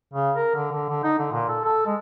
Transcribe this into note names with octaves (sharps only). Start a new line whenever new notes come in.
C#3
A#4
D3
D3
D3
D#4
D3
A#2
A4
A4
G#3